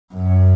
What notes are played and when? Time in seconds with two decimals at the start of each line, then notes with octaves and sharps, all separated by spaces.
0.14 F#2